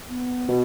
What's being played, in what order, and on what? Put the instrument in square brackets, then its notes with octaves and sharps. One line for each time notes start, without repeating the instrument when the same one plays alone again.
[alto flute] B3
[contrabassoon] B2